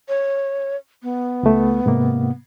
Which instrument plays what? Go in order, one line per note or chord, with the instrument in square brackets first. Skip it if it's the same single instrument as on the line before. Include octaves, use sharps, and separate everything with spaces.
[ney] C#5
B3
[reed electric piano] C#2 A3
G#2 C3 A#3